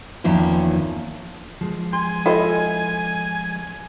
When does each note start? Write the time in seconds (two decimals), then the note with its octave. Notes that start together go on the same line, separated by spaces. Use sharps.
0.24 E2 D#3 F3 A#3 C#4
1.61 F3 G#3
1.93 G#5 C6
2.26 E4 F4 A4 C5 D#5